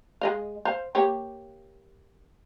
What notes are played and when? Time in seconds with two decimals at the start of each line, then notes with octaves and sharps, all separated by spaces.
0.21 G#3 D#5 F5
0.65 C5 F5
0.95 A#3 G4 C#5